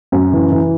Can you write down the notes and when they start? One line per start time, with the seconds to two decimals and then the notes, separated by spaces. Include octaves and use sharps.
0.12 F#2
0.33 E3
0.52 E3